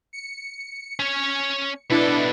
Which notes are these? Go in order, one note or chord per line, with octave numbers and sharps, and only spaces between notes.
C#7
C#4 C#5
B2 D4 E4 A4 B4